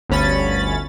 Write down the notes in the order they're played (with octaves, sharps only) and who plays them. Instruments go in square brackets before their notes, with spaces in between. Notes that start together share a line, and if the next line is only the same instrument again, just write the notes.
[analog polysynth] G1 D2 C#4 B5 A6